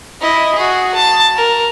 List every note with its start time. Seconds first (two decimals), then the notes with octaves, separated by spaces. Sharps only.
0.21 E4 D#5
0.55 F#4 G#4
0.95 A5
1.36 A#4